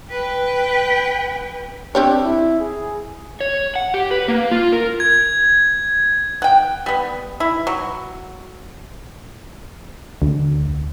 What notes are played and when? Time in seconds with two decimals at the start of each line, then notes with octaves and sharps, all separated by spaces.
0.10 B4 G5
1.95 C4 D4 G4 C#5
2.23 E4
2.60 G#4
3.41 C#5
3.76 F#5
3.94 G4
4.11 B4
4.28 A#3
4.51 F4
4.72 A#4
5.00 G#6
6.42 F#5 G5
6.86 G3 B3
7.40 E4
7.67 F#3
10.22 D2